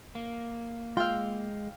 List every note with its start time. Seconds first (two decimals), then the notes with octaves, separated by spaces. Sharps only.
0.15 A#3
0.97 G#3 F4 F5 G5 E6